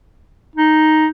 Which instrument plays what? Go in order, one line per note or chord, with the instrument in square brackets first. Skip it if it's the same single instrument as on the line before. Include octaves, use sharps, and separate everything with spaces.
[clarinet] D#4